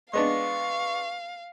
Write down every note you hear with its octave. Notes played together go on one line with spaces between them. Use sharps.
G#3 B3 D4 F5 C#6